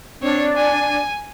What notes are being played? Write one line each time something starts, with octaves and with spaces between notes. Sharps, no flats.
C4 D4 C#5
G#5